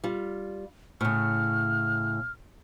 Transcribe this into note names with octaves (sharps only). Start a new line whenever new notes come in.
G3 F4
A2 C#3 F6